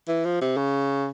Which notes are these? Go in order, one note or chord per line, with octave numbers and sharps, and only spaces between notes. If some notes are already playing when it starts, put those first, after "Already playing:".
E3
F3
C3
C#3